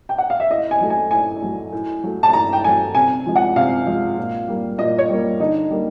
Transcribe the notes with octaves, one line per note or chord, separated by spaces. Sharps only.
G5
F#5
F5
E5
A2 D#5
G#5
F#3 A3
G#5
A2 G#5
F#3 A3
A2
F#3 A3
A5
A2 A#5
G5
F#3 A3 G#5
C3 G#5
F3 G#3
F#5
C3 F5
F3 G#3
A#2
G3 A#3
A#2 D#5
C#5
G3 A#3
D3 D#4
G3 A#3